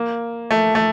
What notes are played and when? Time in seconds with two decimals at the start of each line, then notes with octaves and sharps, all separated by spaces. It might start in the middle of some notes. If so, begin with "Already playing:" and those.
Already playing: A#3
0.51 A3
0.75 A3